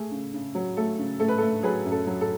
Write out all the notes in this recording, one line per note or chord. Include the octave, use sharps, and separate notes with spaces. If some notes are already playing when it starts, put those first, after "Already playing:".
Already playing: A3 G#4
C#3
C#3
F#3
A3 A4
C#3
A3 A4
B4
A3 A4
F#3 G#4 B4
F#2
A4
F#3
A4